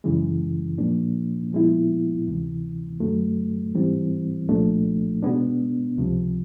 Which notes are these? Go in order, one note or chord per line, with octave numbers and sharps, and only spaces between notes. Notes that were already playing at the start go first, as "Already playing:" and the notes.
F#2 C#3 E3 G#3
A#2 F3 A#3 D4
A#2 F3 G#3 B3 E4
D2 C3 E3
F#2 D3 F#3 A3
G#2 E3 G3 C4
C2 A#2 F3 A3 D4
B2 G#3 B3 D4
C#2 C3 F3